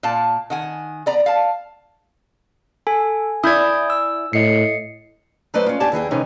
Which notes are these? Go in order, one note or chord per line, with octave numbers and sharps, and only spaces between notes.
A#2 F5 A5
D#3 F#5 G#5
B3 D5 A#5
F5 A5
A4 G#5
E4 D5 D#6 G6 G#6
E6
A2 D#5 C7 C#7
F#3 A3 B4 C5 D5 D#5
C#4 F4
E2 D4 G4 D5 G#5 A5
D#2 E3 G#4 G5
C3 D#3 E3 G#3 C#4 D#4